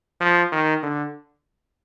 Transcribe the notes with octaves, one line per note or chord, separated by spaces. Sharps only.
F3
D#3
D3